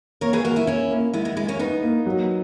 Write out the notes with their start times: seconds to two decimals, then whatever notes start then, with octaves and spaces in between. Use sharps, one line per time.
0.21 A#3 A#4 C#5
0.33 G#4 B4
0.45 A#3 F#4 A#4
0.56 E4 G#4
0.67 A#3 C#4 E4
0.91 A#3
1.13 G#3 B3 E4
1.25 G#3 B3
1.36 G#3 B3 E4
1.48 A#3 C#4
1.59 B3 D#4 B4
1.83 A#3
2.06 F#3